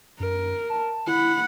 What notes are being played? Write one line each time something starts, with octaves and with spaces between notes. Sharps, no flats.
F#2 A#4
A5
E4 F#5 B5